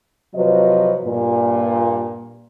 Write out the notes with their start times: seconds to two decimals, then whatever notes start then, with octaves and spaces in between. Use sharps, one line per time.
0.35 C3 F3 F#3 B4 D#5
1.05 G2 A#2